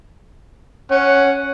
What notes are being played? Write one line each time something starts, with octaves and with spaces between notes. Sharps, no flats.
C#4 F#5